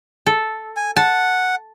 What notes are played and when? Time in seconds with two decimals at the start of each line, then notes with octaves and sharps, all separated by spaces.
0.26 A4
0.76 G#5
0.96 F#5 A5